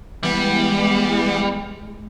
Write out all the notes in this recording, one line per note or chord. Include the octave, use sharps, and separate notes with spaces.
E3 G3 G#3 B3